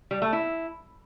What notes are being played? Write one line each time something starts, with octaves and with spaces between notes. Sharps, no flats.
G3
A3
E4